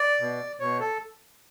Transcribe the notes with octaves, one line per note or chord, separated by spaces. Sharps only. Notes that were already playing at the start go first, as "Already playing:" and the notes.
Already playing: D5
B2
B2 C#5
A4